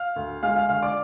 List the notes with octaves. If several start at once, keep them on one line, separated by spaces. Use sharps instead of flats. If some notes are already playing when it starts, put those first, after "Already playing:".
Already playing: F5 F6
D2
G#3 F5 F6
F5 F6
D3 F5 F6
D5 D6